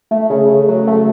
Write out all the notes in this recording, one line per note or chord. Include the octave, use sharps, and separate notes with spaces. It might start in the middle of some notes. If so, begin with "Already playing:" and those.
A3
C#3
C#3
F#3
A3